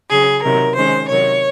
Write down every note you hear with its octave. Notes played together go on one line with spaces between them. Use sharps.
C#3 F#3 C#4 G#4
C3 D#3 F#3 A#4
D#3 G#3 C#4 C5
C3 D#3 F#3 C#5